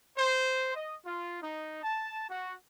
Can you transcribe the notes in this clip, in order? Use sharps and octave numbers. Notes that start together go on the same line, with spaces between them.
C5
D#5
F4
D#4
A5
F#4